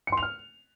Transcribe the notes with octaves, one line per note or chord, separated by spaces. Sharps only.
C#7
C6
F7
F6